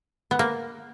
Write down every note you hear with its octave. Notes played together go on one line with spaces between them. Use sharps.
B3
A#3